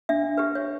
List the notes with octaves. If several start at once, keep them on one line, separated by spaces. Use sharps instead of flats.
D4 E5
G4 B4
C#5